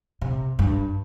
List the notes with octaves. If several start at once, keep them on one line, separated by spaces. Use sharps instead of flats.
C3
G2